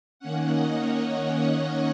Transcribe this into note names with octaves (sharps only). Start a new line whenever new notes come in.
D#3 A#3 C#4 F#5
D#5
C#5